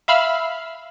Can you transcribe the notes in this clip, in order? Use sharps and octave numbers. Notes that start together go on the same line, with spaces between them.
E5 F5 B5 E6 F6